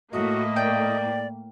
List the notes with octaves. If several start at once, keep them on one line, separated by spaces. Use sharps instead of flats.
A2 A3 A#3 F#4 D#5
D5 G5